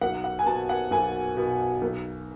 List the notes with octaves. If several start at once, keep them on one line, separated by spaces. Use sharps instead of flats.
B1 F#5
F#5
G#5
B2 A5
F#5
B1 G#5
B2
B1